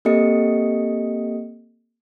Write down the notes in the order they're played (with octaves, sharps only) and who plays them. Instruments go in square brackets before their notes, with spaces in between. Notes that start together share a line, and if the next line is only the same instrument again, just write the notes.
[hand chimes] A#3 C4 G4 A4 D#5 C#7